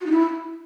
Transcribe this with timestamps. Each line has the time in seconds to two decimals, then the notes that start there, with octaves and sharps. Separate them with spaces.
0.01 F#4
0.06 D#4
0.11 E4